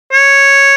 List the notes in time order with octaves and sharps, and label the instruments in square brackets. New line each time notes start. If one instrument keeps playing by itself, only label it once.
[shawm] C#5